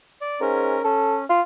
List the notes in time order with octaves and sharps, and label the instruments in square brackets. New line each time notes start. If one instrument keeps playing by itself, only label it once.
[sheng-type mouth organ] D5
[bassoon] G#2 [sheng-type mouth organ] C#4 A#4
[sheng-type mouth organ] C#4 [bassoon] A4
[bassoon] F4